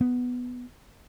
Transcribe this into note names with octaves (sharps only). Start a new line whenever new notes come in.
B3